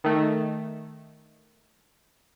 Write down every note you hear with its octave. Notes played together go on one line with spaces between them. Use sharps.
D#3 A3